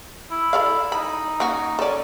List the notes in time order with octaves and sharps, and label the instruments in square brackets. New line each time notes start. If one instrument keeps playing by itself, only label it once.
[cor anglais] E4
[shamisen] A4 D5 F5
[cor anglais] D#4 [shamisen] B5
[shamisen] A#3 C#4 F#4
[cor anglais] C#4 [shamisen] A4 D5